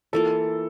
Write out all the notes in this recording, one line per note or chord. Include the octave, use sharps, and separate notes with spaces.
E3 A#3 F4 A4